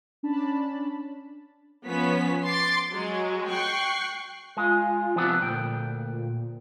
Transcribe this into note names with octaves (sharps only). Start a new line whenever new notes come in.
C#4 D4 A5 B5
F3 B3 C#4 B6
C6 D6 A6 C7
F#3 G#3
G5 C#6 F#6 C7
G#3 F4
C3 F3 B3 D4
D2 A#2 G5